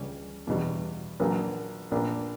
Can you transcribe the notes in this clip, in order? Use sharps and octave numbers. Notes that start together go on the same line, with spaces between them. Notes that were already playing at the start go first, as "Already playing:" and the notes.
Already playing: C#2 C#3 G3 C#4
E2 B2 G3
A#1 A#2 F#3 A#3
A#1 A#2 A#3 D4